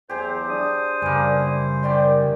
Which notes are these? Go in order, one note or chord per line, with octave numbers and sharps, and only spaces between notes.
E2 F#3 G4 G#4 C5
D4 D#6
F#2 C#3 E3 G3 A#3
D#3 G4 D5 C6